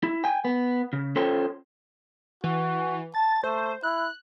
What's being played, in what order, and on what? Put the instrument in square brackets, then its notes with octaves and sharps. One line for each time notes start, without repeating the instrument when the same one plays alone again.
[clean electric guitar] E4
G5 G#5
B3
C#3
C#4 F4 A4 C5 C#5 G5
[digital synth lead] E3 [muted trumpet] F#4
[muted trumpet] A5 [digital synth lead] A6
[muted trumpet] A3 [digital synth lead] C5
[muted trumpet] E4 [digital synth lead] F#6